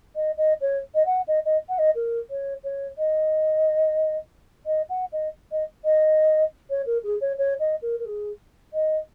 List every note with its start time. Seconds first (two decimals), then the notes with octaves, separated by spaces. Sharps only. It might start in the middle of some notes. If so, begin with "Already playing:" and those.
0.15 D#5
0.37 D#5
0.61 C#5
0.94 D#5
1.05 F#5
1.27 D#5
1.45 D#5
1.68 F#5
1.78 D#5
1.95 A#4
2.30 C#5
2.63 C#5
2.98 D#5
4.66 D#5
4.89 F#5
5.12 D#5
5.51 D#5
5.84 D#5
6.69 C#5
6.86 A#4
7.03 G#4
7.20 C#5
7.37 C#5
7.59 D#5
7.81 A#4
7.99 A#4
8.05 G#4
8.73 D#5